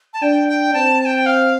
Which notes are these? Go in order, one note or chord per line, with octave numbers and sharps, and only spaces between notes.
A5
D4 G5
G5
C4 A5
A5
G5
F5